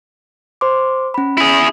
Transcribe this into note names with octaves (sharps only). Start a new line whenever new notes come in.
C5 C6 D6
C#4 B5
E4 G#4